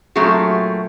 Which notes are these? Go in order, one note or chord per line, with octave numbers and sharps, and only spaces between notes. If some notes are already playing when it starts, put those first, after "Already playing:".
A#2 F#3 A3 C4 F#4 G#4